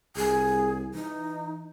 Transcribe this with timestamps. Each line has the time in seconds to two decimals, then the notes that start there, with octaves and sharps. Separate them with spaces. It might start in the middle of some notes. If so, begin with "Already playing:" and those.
0.16 C2 G#4
0.94 E3 D#4